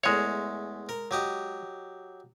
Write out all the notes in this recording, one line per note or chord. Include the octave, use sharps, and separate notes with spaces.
E2 G#3 A3 C#5
A#4
F#3 G4 D#5